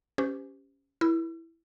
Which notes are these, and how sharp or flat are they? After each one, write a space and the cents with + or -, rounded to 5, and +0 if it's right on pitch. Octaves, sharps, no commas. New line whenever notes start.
C#4 +0 G4 +0 C5 -40
E4 +0 A#4 +25 E6 +40